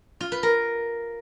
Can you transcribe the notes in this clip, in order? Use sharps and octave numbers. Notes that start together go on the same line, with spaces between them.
F4
B4
A#4